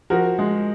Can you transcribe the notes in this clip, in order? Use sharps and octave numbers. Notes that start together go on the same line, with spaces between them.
F3 F#4 A#4
G#3